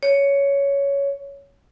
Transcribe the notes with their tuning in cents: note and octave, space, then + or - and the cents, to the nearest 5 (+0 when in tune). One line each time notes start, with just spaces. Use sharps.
C#5 +10